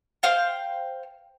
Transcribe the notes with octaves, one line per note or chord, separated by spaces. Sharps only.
C5 F5 G5